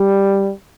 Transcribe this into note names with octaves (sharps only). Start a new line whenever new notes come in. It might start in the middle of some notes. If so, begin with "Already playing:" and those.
Already playing: G3